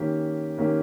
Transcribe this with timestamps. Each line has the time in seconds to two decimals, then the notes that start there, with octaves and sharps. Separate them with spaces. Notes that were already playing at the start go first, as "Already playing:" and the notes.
Already playing: D#3 A#3 C#4 G4
0.58 D#3 A#3 C#4 G4